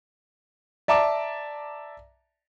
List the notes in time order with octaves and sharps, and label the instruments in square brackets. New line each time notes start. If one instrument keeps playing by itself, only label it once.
[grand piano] D5 E5 A5 A#5 D6